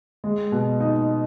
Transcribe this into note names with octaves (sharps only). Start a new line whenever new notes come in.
G#3
B2
D#4